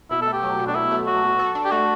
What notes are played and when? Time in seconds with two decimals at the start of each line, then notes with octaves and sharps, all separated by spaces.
0.11 B2 E4
0.22 A4
0.27 A3
0.33 G4
0.43 F#3
0.59 B2
0.67 D4
0.75 B2 E4
0.91 A3
1.07 F#3 F#4
1.23 B2
1.39 A4
1.55 D4
1.65 G4
1.71 A3 F#4